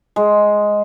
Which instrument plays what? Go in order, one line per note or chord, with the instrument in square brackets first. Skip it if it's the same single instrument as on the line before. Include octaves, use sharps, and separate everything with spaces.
[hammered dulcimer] G#3